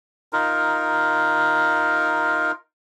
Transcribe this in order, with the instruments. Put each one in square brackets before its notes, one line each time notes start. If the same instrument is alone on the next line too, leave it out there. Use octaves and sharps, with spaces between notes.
[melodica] D#4 F4 A#4